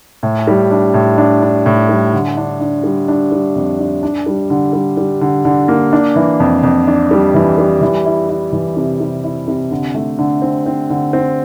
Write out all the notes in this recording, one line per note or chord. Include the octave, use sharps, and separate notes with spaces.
A2
G3
D4
A2
D4
D4
A2
G3
D3
D4
D4
G3
D4
G3
F2
D4
D4
G3
D3
G3
G3
D3
D3
A#3
D4
E3
F2
F2
D4
G3
E3
G3
E3
E4
E4
E3
C3
C3
E4
C3
D3
A3
D3
C4
C4
D3
C4